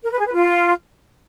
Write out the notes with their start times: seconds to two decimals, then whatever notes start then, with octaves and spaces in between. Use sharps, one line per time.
0.04 A#4
0.12 B4
0.19 G#4
0.26 B4
0.34 F4